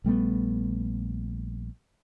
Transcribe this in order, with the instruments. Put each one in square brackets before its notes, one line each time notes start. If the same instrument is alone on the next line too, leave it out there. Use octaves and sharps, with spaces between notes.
[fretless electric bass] A#1 G3 A3 B3